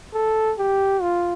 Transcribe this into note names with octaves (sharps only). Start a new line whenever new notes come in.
A4
G4
F4